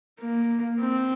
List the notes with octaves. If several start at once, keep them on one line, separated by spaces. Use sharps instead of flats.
A#3
C4